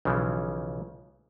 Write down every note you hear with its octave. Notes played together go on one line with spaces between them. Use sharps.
B1 C#3 E3 F3